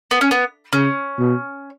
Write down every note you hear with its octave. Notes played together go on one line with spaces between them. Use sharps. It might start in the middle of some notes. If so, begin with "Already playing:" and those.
B3
C#4
B3
C#3 C#4
B2